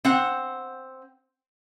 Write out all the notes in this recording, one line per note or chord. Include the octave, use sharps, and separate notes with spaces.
C4 F#5